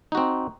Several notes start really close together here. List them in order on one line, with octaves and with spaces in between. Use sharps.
D#4 F#4 C4